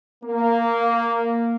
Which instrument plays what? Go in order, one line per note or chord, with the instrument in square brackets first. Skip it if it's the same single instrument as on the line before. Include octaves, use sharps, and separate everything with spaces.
[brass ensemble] A#3